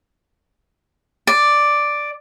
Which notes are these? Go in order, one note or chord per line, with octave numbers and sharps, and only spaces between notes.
D5